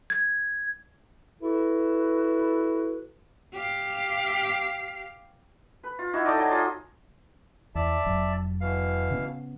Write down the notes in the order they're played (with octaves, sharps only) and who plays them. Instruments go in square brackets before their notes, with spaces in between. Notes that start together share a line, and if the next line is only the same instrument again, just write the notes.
[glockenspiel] G#6
[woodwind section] E4 F#4 A4 B4
[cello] G4 F5
[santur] B4
F4
D#4 E4 F#4
D#4 A4 D5 D#5
F#3 G5
F#3 F4 G#4 D#5
[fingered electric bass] E2 [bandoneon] D5 E5 A5
[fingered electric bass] F1 F#3
[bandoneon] B2 E3 F5
[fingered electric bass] C#3 B3